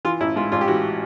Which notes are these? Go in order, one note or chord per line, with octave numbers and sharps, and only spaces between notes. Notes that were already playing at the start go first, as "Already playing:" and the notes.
E3 F4
A1 E4
G#2 F4
A1 F4
G4
E3 F#4